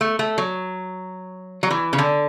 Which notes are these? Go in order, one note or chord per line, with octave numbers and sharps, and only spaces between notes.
A3
A3
F#3
F#3
E3
C#3
D3